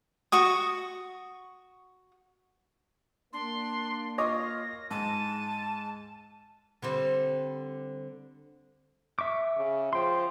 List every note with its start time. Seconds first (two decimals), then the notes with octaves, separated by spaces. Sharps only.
0.32 F#4 C#6 D#6
3.33 A#3 D4 C6
4.18 F4 C#5 D#5 D6 A#6
4.91 G#2 G#3 A5 D#7
6.82 D3 G3 C4
9.19 E5 C#6 D6
9.57 C#3
9.93 F3 G5 C6